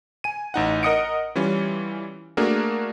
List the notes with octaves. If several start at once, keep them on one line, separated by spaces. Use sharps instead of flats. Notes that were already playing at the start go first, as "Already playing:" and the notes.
G#5 D#7
A1 D#4 F#5
A#4 D#5 F#5 D#6 C#7 D7
E3 G3 C#4 F4
A3 A#3 D4 F#4 G#4 A#4